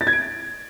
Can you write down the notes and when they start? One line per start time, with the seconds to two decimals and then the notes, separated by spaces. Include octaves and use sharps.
0.01 A6
0.07 G#6
0.13 D7